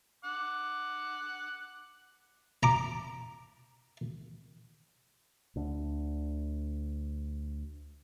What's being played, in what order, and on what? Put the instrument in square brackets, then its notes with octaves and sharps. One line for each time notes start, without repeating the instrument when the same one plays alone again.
[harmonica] F#5 D6
[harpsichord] A#5 D6
[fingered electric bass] D2 D3